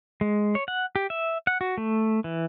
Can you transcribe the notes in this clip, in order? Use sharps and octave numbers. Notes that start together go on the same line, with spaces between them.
G#3
C#5
F#5
G4
E5
F#5
F#4
A3
E3